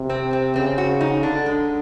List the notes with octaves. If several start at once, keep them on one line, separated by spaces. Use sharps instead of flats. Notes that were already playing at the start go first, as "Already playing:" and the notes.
Already playing: C3
C4
C4
C#3 C4
F#4
D#4
D3 D4
G#3